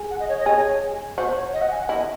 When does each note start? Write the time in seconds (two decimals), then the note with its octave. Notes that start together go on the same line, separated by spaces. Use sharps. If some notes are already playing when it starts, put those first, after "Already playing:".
Already playing: G#4
0.10 F#5
0.20 D#5
0.29 C#5
0.38 D#5
0.46 G#4 C#5
1.17 F#4 C5
1.36 C#5
1.53 D#5
1.61 F#5
1.71 G#5
1.80 F#5
1.89 E4 D#5